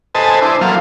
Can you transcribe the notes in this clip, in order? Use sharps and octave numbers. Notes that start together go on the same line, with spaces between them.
A4 B4 C5 D#5 G#5 A5
D4 E4 C5
F3 F#3 A#3 A4 F5